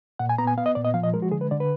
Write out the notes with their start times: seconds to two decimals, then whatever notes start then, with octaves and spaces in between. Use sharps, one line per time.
0.19 A#2 F#5
0.29 G#5
0.38 B3 A#5
0.47 G#5
0.58 B3 F5
0.66 D#5
0.75 A#2 D5
0.85 D#5
0.94 F3 F5
1.04 D#5
1.14 G#3 A#4
1.22 F#4
1.32 D3 G#4
1.41 B4
1.51 D3 D5
1.60 B4